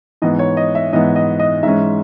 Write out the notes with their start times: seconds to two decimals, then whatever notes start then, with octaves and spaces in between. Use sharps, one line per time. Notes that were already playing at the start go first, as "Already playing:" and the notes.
0.22 G#2 E3 B3 D#5
0.39 C#5
0.57 D#5
0.75 E5
0.93 G#2 E3 B3 D#5
1.16 D#5
1.39 D#5
1.63 G#2 E3 G#3 C#4 E5